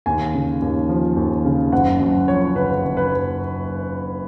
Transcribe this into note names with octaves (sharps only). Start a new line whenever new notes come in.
D#2 G#5
C#3
D#2
F3
D#2
C#3
F#1 F#5
F#2
F3 C#5
C#3 B4
F#1
B4